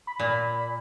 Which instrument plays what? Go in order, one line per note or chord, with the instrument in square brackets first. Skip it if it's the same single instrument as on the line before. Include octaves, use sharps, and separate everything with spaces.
[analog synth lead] B5
[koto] A#2